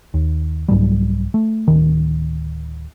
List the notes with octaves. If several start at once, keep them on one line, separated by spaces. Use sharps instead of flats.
D#2
C2 G#2 F#3 G3
A3
D1 D#3